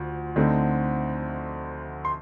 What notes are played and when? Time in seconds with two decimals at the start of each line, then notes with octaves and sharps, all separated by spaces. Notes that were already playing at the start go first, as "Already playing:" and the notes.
Already playing: D2 F3
0.36 D2 D3 A3 C4 D#4
2.05 C6